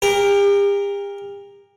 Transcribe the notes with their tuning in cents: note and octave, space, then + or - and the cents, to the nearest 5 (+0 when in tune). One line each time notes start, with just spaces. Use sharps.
G4 +40 A#4 +0